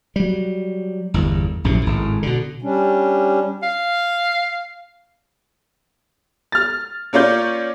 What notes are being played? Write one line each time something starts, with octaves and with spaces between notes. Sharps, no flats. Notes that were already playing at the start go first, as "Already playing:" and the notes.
F#3 G3
G1 E2
A#1 F#2 A2 C3
G#1 A2
B2 D3
G3 C#4 D4
F5
F6 A6
A#3 C#4 F4 D5 G6